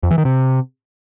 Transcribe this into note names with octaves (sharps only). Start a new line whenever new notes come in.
F2
E3
D#3
C3